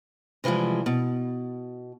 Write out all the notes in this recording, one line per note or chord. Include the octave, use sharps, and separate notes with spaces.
C3 E3 F3 G3 G#3
B2